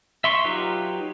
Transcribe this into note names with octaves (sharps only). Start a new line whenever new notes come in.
E5 C6 C#6
F#3 D#4 F4 G4 B4